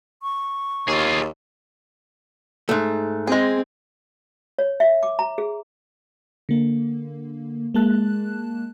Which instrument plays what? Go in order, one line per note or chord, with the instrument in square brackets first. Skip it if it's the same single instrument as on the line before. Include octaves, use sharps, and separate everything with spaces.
[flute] C#6
[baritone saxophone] D#2 [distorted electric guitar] F4 G#4
[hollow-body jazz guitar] G#2 A3
[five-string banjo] G#3 G#4 [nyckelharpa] C4
[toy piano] C#5
E5
D6
A#5
G#4
[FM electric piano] D3 A#3
G#3 A#3 A5 F#6